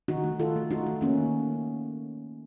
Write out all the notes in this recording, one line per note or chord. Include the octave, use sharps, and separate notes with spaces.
D#3 D#4 F#4
A3
D#3 F4 A4
A3
A3 D#4 F#4
A3
D#3 A#3 C#4
D#3